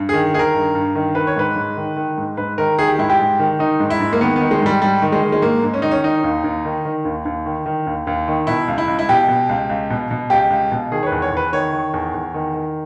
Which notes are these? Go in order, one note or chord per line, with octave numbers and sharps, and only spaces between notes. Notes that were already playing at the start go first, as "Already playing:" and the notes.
Already playing: G2
D#3 G#4
D#3 G#4
A#4
G2
G2
D#3
D#3 B4
C#5
G#2 B4
G#2
D#3
D#3
G#2
G#2 B4
D#3 A#4
D#3 G#4
G4
G#2 E4
G4
G#2
D#3
D#3 D#4
G#2
E4
G#2
A#3
D#3 B3
D#3 B3
G#3
G#2 G3
G#2 G3
D#3
G#3
D#3
G#3
G#2 A#3
G#2
C#4
D#3 D#4
C#4
D#3 D#4
D#2
D#2
D#3
D#3
D#2
D#2
D#3
D#3
D#2
D#2
D#3
B2 E4
C#2
E4
C#2
E4
B2 G4
B2
C#2
C#2
B2
B2
C#2 G4
C#2
B2
D#3 G#4
C#5
B4
E2
C#5
E2 B4
D#3 C#5
D#3
E2
E2
D#3
D#3